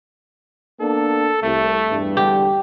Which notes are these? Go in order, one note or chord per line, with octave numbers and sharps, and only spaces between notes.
A#3 B3 D4 A4
C2 A3
E2 G2
D3 G4